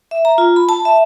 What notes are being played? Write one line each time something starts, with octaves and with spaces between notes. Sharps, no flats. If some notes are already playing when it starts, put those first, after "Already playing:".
E5
A#5
F4
B5
A5
E5